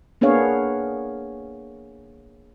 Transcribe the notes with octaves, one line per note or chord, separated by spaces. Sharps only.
A#3 B3 D4 G#4 C#5 F5